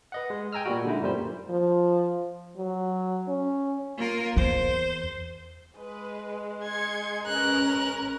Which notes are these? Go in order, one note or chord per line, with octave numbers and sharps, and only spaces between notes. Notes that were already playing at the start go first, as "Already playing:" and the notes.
B4 D#5 F#5
G#3
G5 G#5 A#5 E6 F6
A#2 G3 F#4
D3 G#3 D#4 E4
F#2 A#2 G3 C5
F3
F#3
C#4
A#3 F4 A#4
E2 C5
G#3 B4
C6 G#6 C#7
C#4 A#4 B4 F#6